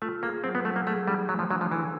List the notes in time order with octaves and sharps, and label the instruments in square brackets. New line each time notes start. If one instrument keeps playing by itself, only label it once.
[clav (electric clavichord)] A3 [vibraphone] F4
[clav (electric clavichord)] A#3 [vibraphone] G#4
[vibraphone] F#3 [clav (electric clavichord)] C4
[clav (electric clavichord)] B3
[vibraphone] F#3 [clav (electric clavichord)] A3
[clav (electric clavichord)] A#3
[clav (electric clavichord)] A3 [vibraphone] G#4
[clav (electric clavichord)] G3 [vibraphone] D#4
[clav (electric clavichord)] F#3 [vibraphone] A3
[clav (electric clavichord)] F3
[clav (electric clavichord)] F#3 [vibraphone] D4
[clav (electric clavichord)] F3
[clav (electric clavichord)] E3 [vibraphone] A4